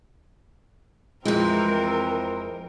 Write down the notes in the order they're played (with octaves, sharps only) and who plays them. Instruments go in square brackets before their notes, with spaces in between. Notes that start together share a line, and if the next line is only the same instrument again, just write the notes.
[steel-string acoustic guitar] F2 G#3 [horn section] E3 C4 [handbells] E4 F4 [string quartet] A#4